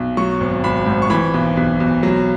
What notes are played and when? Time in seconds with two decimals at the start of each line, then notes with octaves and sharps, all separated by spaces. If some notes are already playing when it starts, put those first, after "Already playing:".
Already playing: B1
0.17 F#3 C#6
0.40 G#1
0.64 G#1 B5
0.86 G#2
1.02 C#6
1.10 E3 B5
1.34 B1
1.57 B1
1.80 B1
2.03 F#3